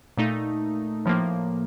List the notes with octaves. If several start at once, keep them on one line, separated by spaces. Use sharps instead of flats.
A#2 A3 D#4
A2 F3 A#3